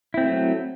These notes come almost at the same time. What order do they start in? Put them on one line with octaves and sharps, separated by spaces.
E4 C4 A3 F#3